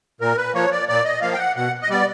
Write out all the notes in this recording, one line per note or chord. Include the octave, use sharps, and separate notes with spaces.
A#2 A#4
B4
F3 A#3 C#5
D5
A#2 D5
D#5
F3 A#3 F5
G5
F#5
B2 F#5
D#5
G3 B3 D5